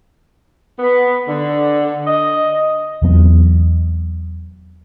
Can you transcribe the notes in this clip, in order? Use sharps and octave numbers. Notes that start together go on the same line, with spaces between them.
B3
D3
D#5
E2 F#3 B3 C4